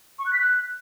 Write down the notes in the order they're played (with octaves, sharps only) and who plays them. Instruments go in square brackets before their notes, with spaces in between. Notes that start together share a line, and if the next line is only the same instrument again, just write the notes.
[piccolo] C#6
F#6
B6
F#6